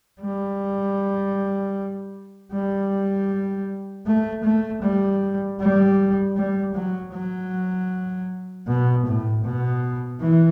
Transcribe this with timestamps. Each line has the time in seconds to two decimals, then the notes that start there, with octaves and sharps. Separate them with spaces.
0.22 G3
2.53 G3
4.06 A3
4.44 A3
4.82 G3
5.60 G3
6.36 G3
6.75 F#3
7.13 F#3
8.68 B2
9.06 A2
9.44 B2
10.21 E3